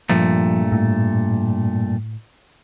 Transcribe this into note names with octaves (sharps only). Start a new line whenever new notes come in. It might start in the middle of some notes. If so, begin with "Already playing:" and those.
G2 A#2 F3 A3
A2